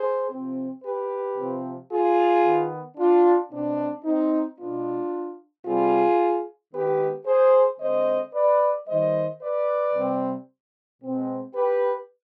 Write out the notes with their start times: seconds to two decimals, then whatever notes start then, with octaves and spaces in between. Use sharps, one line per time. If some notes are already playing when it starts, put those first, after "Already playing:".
Already playing: G#4 C5
0.29 C3 F3 C4
0.83 G4 B4
1.36 C3 F3 C4
1.90 F4 G#4
2.44 D#3 B3
2.97 D4 F4
3.51 B2 G#3 C4 D4
4.04 C4 D#4
4.58 B2 G#3 B3 D4 F4
5.65 C3 G3 C4 F4 G#4
6.72 D#3 G#3 B3 G4 B4
7.26 G#4 C5
7.79 D3 G#3 C4 C5 D#5
8.33 B4 D5
8.87 D#3 G3 B3 C5 D#5
9.41 B4 D5
9.94 C3 G3 C4
11.02 B2 G#3 C4
11.55 G4 B4